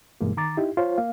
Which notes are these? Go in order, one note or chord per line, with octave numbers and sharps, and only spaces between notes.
G2 B2 E3 G#3 A#3
D#3 A#5 D6 A6
D#4 E4 G4
F4 C5 C#5
A#3 F5